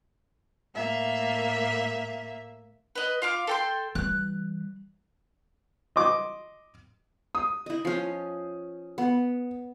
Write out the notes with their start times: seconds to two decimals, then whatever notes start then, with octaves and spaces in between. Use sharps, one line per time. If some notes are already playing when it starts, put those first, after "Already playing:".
0.76 A2 A#3 E5
2.95 B4 D#5
3.22 F4 F5 D6
3.47 A4 G5 C6
3.95 E3 G3 F#6
5.96 D#5 C6 D6
7.35 D#6
7.66 E4 D#5
7.85 F3 C#4
8.98 B3